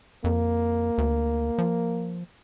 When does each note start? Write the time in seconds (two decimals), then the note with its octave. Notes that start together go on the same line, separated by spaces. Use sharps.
0.24 F2 A#3
0.98 D2
1.58 F3